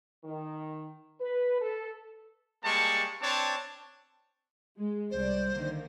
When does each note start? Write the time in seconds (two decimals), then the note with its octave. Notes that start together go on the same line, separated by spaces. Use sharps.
0.24 D#3
1.21 B4
1.60 A4
2.64 G3 G#3 A#3 A5 C#6
3.21 C4 D4 C#5 A5
4.77 G#3
5.11 C2 C5 D5
5.53 D3 D#3 A#3